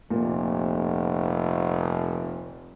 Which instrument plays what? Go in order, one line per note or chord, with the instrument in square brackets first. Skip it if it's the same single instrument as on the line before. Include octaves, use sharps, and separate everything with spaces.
[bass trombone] F1 [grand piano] A#2